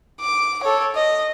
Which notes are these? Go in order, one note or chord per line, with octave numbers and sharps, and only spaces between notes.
D6
A4 C#5
D#5